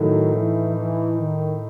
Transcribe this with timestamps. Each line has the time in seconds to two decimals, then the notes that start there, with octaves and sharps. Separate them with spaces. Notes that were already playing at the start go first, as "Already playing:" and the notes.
Already playing: A2 D#3 F#3 A3 D#4
0.35 E3
0.75 E3
1.16 D#3